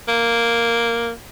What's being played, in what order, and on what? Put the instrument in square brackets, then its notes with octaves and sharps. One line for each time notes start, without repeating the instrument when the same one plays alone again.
[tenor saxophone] A#3